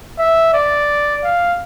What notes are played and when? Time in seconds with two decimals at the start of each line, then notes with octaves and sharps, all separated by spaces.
0.18 E5
0.54 D5
1.24 F5